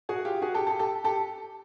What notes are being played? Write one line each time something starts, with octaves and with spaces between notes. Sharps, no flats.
F#4 G#4
F4 G4
F#4 G#4
G4 A4
G4 A4
G4 A4
G4 A4